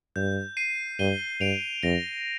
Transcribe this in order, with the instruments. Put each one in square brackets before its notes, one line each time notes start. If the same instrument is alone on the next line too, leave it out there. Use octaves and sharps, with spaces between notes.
[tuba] G2 [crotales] G6
[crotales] C7 D#7
[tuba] G2 [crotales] D#7 G7
[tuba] G2 [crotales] D7 F7
[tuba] F2 [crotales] A#6 D7